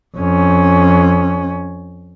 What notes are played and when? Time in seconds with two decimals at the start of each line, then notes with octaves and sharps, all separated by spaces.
0.17 F2 C#4